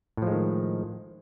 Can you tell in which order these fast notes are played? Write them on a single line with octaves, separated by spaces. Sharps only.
A2 F3 G#3 D#3